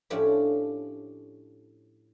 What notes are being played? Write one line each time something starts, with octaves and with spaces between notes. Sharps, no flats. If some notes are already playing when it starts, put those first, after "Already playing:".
A2 F3 C#4 D4 G4 B5